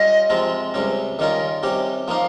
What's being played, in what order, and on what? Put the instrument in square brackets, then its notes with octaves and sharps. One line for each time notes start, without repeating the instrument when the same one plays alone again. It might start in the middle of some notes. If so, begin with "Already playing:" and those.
Already playing: [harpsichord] G3 C#4 F4 [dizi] D#5
[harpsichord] C3 F3 G#3 C4 F4
C#2 C3 G3 C#4
[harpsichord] D#3 G3 C#4 F4 A#4 [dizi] D#5
[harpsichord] C3 G3 C#4 G4
[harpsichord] F3 A#3 D#4 A#4 [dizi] F5